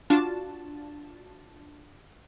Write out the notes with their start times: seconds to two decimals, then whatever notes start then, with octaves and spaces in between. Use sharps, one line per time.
0.10 D4 F4 F#4 A5